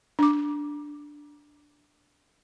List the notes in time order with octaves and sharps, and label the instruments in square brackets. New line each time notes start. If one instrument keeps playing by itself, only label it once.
[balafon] D4 D6